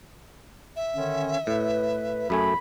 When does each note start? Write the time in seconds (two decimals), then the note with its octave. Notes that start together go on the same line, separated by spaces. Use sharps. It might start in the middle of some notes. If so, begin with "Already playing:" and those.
0.76 E5
0.96 D3 D#3 C#4
1.47 A2 B4
2.30 F#2 A3 G#5 B5